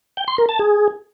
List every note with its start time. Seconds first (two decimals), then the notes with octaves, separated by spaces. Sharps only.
0.17 G5
0.28 C6
0.38 A#4
0.49 A5
0.59 G#4